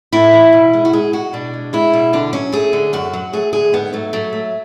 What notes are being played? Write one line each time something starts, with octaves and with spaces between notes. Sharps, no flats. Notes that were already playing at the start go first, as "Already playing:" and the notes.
A2 E4
E3
B2
G#3
F#4
G#3 G#4
G#3 F#4
B2 D4
G#3
G#3 E4
B2
D3 D4
F#3 C#4
A3 G#4
D3
F#2 F#4
F#3
A3 G#4
D3 G#4
G#2 B3
F#3 A3
F#3 A3
A3